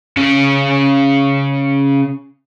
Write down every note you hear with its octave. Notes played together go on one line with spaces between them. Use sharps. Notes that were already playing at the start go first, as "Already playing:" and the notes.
C#3 C#4